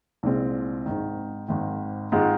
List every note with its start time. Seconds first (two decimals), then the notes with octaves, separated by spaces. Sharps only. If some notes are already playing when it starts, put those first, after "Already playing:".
0.23 C2 A#2 G#3 C4
0.86 G#1 G#2 D#3
1.48 G#1 G#2 D#3
2.12 G#1 G#2 D#3 G#3 F4